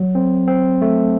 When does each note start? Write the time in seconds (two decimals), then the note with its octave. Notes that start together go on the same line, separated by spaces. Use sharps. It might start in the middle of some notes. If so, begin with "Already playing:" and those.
Already playing: F#3
0.15 C4
0.48 C4
0.82 A3